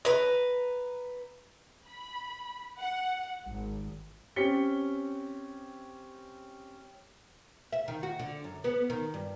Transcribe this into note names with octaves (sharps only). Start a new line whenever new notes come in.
B4 A#5
B5
F#5
G#1
C4 C#4 G4 B6 C#7 G7
E5
D#3
F#4
D3
F#2
B3
D#3
G2